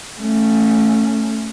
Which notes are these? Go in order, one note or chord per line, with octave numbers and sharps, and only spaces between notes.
A3 C#4